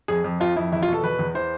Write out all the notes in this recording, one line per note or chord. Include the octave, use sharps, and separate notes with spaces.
F2 G#4
F2
F2 F4
F2 E4
E2 E4
F4
B2 A4
E2 B4
E2
E3 C5